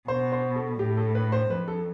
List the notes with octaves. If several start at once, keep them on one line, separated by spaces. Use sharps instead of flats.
B2 C5
C5
A4
A2 G4
A4
B4
C5
F2 B4
A4